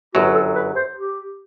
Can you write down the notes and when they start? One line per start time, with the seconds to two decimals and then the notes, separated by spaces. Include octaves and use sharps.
0.14 G1 F#2 F#3 F#4
0.35 A4
0.55 B4
0.76 C5
0.96 G4